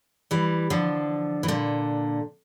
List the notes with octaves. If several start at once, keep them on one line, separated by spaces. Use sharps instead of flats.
E3 G3
D3 F3
E3
A#2 D3